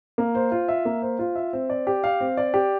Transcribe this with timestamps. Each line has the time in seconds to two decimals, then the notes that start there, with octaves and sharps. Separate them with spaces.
0.18 A#3
0.35 C5
0.52 F4
0.68 E5
0.85 A#3
1.02 C5
1.19 F4
1.36 E5
1.53 C4
1.70 D5
1.87 G4
2.04 F5
2.20 C4
2.37 D5
2.54 G4